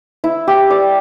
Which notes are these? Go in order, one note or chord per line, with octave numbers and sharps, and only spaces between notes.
E4
G4
D5